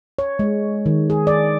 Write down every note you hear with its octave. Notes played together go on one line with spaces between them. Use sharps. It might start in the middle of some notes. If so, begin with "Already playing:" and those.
C#5
G#3
D#3
G#4
D5